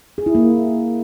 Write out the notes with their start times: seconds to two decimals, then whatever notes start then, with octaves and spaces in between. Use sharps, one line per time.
0.18 G#4
0.26 E4
0.35 A#3